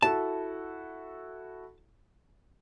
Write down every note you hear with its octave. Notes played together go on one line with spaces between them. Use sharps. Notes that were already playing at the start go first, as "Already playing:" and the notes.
E4 F#4 A4 A5